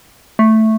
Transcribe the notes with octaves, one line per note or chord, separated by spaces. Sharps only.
A3